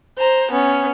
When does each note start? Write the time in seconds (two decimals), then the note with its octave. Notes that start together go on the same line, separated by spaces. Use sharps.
0.18 C5 A#5
0.51 B3 C#4